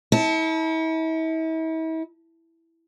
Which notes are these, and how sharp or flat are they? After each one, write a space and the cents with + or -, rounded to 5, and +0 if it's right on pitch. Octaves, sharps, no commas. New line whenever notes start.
E4 -40 A5 +0